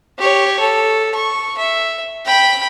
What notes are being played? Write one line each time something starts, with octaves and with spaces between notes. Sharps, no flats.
G4 C#5
A4
C#6
E5
G5 B5